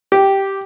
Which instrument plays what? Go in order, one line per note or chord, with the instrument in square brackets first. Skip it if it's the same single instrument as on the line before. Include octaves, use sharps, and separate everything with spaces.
[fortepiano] G4